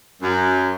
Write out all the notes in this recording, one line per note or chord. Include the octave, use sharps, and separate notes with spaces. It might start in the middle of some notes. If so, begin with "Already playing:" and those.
F#2